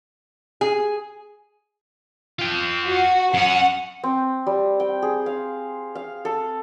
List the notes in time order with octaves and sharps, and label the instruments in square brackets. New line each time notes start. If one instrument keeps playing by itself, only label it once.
[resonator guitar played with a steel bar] G#4
[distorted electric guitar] F4 G5
[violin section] F#4
[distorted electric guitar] F#2 C#4 [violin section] F#5
[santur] C4
G3
G5
G#4
F5
F5
A4